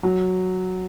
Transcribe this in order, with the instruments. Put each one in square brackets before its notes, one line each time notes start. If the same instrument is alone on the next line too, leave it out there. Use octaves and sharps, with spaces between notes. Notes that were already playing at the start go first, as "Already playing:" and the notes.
[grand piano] F#3